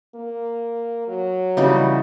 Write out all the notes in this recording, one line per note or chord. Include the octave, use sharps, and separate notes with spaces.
A#3
F#3
C#3 E3 G3 D#4 F#4